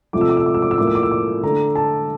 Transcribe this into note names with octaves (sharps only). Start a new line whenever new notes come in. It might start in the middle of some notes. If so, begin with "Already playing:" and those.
C3 F3 A3 D6
E6
D6
E6
D6
E6
D6
E6
A2 F3 A#3 D6
E6
D6
E6
D6
D3 A3 A#5
A5